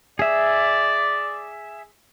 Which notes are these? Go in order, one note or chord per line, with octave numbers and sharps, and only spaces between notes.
G#4 D5 E5